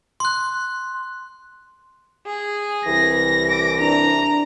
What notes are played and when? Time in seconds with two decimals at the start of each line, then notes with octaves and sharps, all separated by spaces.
0.20 C6 F#6
2.25 G#4
2.86 C2 E3 A#6
3.48 D6
3.80 D4 A#5